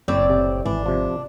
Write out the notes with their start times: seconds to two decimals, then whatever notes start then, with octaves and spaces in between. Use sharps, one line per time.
0.08 F#1 A2 C4 D5
0.30 C3
0.66 G#1 E3 D4
0.86 C3 F3